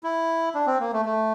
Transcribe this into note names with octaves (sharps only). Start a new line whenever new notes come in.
E4
D4
C4
A#3
A3
A3